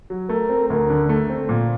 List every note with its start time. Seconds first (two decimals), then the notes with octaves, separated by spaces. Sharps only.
0.10 F#3
0.29 A3 A#4
0.49 C4
0.69 D2 A#4
0.89 D3
1.09 A3
1.30 C4
1.49 A#2